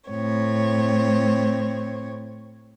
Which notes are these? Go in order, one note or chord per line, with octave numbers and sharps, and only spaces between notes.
A2 C4 C#5